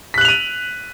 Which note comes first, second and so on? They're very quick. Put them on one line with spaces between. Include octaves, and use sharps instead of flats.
B6 F#6 F#7 F7 D#7